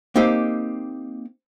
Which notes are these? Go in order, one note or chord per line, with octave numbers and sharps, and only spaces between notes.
A#3 C4 D#4 G4